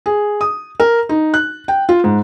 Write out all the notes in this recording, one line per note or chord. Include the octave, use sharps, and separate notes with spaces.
G#4
D#6
A#4
D#4
F#6
G5
F4
G#2